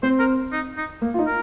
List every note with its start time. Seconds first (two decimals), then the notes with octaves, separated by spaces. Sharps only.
0.03 C4 C5
0.19 A#4
0.52 D#4
0.77 D#4
1.02 A#3
1.14 F4
1.19 D#4
1.27 A#4